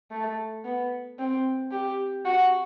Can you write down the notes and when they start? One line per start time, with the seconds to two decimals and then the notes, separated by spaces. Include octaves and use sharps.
0.11 A3
0.65 B3
1.19 C4
1.71 G4
2.25 F#4